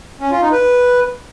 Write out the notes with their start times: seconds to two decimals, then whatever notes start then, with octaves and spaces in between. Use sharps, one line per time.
0.21 C#4
0.31 F4
0.41 D#4
0.52 B4